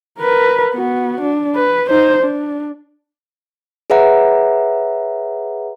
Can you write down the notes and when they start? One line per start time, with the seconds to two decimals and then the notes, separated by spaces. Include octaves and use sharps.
0.19 A#4 B4
0.74 B3 F#4
1.21 D4
1.55 B4
1.90 D#4 C5
2.23 D4
3.90 G#4 B4 C#5 E5 F#5 A#5